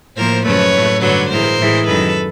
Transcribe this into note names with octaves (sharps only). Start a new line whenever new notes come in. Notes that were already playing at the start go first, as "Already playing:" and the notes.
A2 F3 A#3 A#4 C5
F#2 C#3 F3 A3 B4 C#5
A2 F#3 A3
G2 D3 F#3 B4 C#5
A2 E3 G#3 A#4 C5
A2 E3 G#3
F#2 D#3 G#3 A4 B4